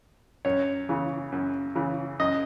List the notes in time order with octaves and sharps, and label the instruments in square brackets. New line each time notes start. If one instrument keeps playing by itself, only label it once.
[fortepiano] F#2 C#5
C#3 E3
F#2
C#3 E3
F#2 D#5